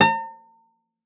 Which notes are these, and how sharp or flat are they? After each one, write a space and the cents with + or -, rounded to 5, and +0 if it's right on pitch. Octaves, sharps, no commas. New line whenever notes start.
A#5 -45